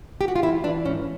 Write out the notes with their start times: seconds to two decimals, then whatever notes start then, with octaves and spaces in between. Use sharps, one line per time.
0.21 G4
0.28 F#4
0.36 F4
0.43 E3 E4
0.64 E3 D4
0.85 G#2 C#4